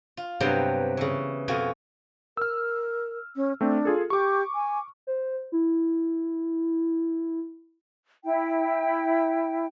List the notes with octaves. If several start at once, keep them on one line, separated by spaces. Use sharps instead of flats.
F4
G2 C3 F#3 B3 G5 C6
C#3 E3
F2 B2 F4 F#4 G#5
A#4 E6 F6
C#4
A3 C4 D4
F4 G#4 A4
G4 C#6 D6
G#5
C5
E4
E4 G5